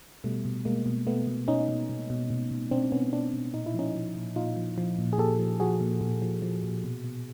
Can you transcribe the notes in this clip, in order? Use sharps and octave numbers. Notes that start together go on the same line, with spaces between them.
B2 G3 A3
B2
B2 G#3 A#3
B2
B2 A3 B3
B2
B2 C#4 D#4
B2
B2
B2
B2
B2
B2 C4 D4
B2 B3 C#4
B2 C4 D4
B2
A#2 D#4
E4
F3 C#4 D#4
F3
A#2
A#2 D#4 F4
F3
F3
A#2
G#4
A#2 G4 A4
F3
F3 F#4 G#4
A#2
A#2
F3
F3
A#2
B2
B2